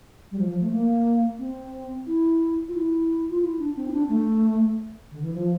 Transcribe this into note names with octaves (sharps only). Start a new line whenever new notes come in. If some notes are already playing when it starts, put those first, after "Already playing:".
G3
F3
F3
A3
A#3
C4
E4
F4
E4
F4
E4
D4
C4
E4
D4
A3
D3
E3
F3